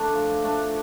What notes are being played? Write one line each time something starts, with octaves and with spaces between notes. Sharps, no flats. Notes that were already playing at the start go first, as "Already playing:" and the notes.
Already playing: A3 D4
F3
A3 D4